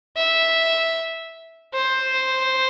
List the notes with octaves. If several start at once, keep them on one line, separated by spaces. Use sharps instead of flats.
E5
C5